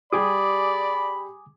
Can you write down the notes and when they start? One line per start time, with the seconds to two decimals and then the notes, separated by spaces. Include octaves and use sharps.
0.12 G3 G4 G#4 D5 G#5 B5 D6 D#6